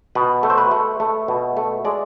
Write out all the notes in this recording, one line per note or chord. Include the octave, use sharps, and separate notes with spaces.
B2 B4
A3
C5
B4
A3
A3
B2
A3
G#3 D5